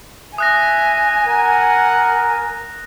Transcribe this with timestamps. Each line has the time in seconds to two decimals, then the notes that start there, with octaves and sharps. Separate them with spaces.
0.38 E5 G#5 D#6 F#6 A#6
1.27 A#4 F#5